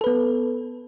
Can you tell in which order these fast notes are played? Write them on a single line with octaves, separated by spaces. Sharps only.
A4 B4 B3